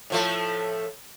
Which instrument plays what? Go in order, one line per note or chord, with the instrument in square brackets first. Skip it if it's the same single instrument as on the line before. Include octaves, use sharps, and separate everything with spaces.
[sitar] A2 F3 A3